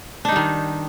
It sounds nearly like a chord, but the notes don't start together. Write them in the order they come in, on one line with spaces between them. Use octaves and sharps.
D4 D#4 G3 D#3